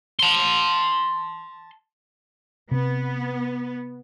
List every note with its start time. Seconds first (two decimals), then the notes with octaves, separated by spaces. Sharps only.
0.19 A5 C6
2.71 C3 B3 C4